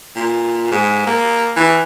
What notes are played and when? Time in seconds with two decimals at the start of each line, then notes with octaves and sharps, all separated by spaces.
0.16 A#2
0.71 G#2
1.06 A#3
1.56 E3